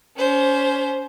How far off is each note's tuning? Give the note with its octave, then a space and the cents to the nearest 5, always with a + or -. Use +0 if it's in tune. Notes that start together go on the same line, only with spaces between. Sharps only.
C#4 +30 C5 +0